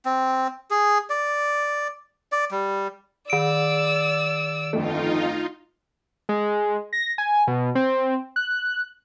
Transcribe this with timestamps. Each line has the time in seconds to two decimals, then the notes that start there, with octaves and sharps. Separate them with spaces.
0.05 C4
0.71 G#4
1.10 D5
2.32 D5
2.51 G3
3.30 D#3 D5 E6 D7
4.73 G1 F2 A3 D#4 F4
6.29 G#3
6.93 A#6
7.18 G#5
7.47 B2
7.75 C4
8.36 F#6